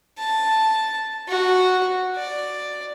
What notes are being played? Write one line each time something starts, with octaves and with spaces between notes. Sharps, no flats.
A5
F#4
D5